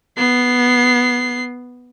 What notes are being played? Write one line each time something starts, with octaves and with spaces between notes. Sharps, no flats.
B3 C7